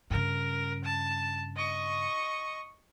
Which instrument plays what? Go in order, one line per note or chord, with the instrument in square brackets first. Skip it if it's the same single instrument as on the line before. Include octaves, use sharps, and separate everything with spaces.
[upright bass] G2 C#3 [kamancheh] A#4
[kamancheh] A5
D#5 C#6